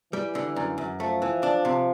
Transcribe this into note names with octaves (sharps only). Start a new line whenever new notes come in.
E3 G3
D3
F#2
F#2
F3 A3
E3
D4
C3